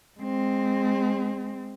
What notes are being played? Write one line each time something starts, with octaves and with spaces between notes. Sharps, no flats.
G#3 C4